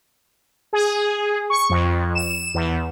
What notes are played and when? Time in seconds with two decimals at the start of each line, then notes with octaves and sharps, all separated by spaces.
0.73 G#4
1.50 C#6
1.70 F2
2.15 E7
2.54 E2